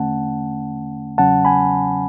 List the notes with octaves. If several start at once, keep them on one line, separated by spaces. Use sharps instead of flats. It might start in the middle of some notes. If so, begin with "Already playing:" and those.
Already playing: E2 D3 A3 C#4 F#5 A5
E2 C#3 F#3 C#4 F#5 A5
G#5 B5